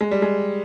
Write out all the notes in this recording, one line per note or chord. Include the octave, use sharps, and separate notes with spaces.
G#3
G3
G#3